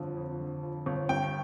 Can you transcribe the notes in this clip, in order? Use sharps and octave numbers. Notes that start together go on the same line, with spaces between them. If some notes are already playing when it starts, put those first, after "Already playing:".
Already playing: G1 F2 D3 F3
F2
D3
F3
G1
G2 G5